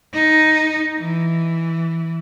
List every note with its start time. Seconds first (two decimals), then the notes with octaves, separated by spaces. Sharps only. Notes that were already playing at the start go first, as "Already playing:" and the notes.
0.14 D#4
0.98 E3